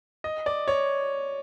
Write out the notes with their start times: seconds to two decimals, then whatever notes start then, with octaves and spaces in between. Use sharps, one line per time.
0.24 D#5
0.46 D5
0.68 C#5